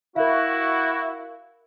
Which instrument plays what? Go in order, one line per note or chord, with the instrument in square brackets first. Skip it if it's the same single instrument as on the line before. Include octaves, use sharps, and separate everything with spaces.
[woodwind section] E4 F#4 [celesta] A#4 F5